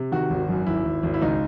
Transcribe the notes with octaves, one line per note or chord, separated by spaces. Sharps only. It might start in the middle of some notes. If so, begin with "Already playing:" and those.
Already playing: C3
D#3 F#4
G#1
F#2
G#1 E4
G#1
G#1
E4
C#2 D#4